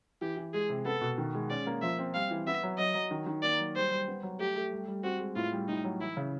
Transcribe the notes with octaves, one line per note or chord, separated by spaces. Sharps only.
E3 G4
E3
G#3 G#4
C3
B3 A4
B2
D#3
G#3
C#4 D5
A#3
F3 E5
C4
G3 F5
E3
B3 E5
F#3
F#3 D#5
F#3
D#3
D#3
A#3 D5
F#3
G3 C5
G3
B3
F#3
A3 G4
A3
G3
G3
C4 F#4
G#3
A2 F4
G3
A2 D#4
F#3
E3 E4
C#3